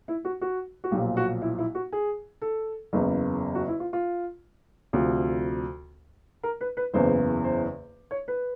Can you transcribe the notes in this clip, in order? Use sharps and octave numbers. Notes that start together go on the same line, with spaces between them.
E4
F#4
F#4
F#4
B1 A#2 F3 G4
F#4
E4
E4
F#4
G#4
A4
F#1 E2 C#3
F#4
E4
F4
F4
D2 C3 F3
A#4
B4
B4
F#1 E2 C#3 E3 C5
C5
C#5
B4